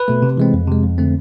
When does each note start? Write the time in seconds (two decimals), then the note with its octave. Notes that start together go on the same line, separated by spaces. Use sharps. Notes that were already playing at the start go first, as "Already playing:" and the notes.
Already playing: B4
0.08 B2 A3
0.22 C3
0.38 E3 G#3 C4
0.53 F2
0.68 C3 G#3
0.83 F2
0.98 D3 A3 C4